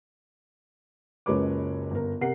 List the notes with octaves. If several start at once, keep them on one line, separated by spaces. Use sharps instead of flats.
F#1 C#2 G#3 B4 C#5 D6
G1 A#4
C3 A#4 F#5 C7